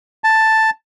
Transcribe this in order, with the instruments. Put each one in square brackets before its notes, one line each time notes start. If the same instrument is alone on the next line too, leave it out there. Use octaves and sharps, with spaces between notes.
[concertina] A5